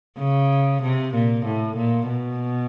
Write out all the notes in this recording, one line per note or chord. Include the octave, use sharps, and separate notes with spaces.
C#3
C3
A#2
A2
A#2
B2